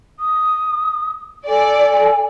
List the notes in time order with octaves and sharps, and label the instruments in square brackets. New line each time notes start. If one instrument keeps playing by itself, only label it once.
[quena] D#6
[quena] A4 [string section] D5 [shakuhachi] G#5